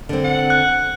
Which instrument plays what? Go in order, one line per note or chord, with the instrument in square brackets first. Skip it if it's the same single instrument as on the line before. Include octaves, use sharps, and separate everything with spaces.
[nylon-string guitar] D3 C4
[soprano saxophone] F#5
[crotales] F#6